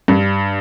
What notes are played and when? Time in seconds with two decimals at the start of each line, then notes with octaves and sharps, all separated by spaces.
0.08 G2